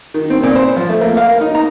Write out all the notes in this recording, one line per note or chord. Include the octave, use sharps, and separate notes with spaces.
D#3
C4
A#2
C5
F3
A3
A#3
F5
A#4
D#4
A#5